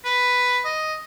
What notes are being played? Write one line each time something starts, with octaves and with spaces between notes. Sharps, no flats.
B4
D#5